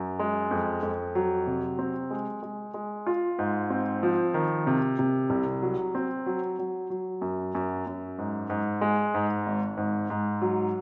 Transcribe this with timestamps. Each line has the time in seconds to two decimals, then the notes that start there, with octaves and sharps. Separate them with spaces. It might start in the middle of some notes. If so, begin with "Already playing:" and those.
Already playing: F#2
0.19 G#3
0.51 F2
0.83 F2
1.15 F#3
1.47 C3
1.79 C4
2.11 G#3
2.43 G#3
2.74 G#3
3.07 F4
3.39 G#2
3.70 C4
4.03 F3
4.34 D#3
4.67 C3
4.99 C3
5.30 C2
5.62 F#3
5.95 C4
6.26 F#3
6.59 F#3
6.90 F#3
7.22 F#2
7.55 F#2
7.87 F#2
8.18 G#2
8.50 G#2
8.81 G#3
9.14 G#2
9.46 G#1
9.77 G#2
10.10 G#2
10.42 F#3